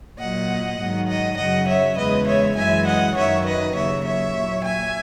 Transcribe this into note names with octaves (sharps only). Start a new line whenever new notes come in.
A#2 F#3 D#5 F#5
G#2 D#3 F#3
D#5 F#5
F#2 C#3 F#3 D#5 F#5
C#5 E5
E2 C#3 G#3 B4 D#5
C#5 E5
F#2 E3 G#3 E5 G#5
D#5 F#5
F#2 D#3 F#3 C#5 E5
B4 D#5
D#2 C#3 F#3 C#5 E5
C#5 E5
A#2 F#3
E5 G#5